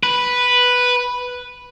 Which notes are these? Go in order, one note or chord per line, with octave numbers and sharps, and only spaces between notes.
B4